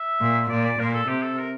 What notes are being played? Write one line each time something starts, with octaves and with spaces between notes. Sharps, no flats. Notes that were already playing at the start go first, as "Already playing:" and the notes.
Already playing: E5
A#2
A#2 D5
D5
A#2 A#4
A4
C3 G4
A4
A#4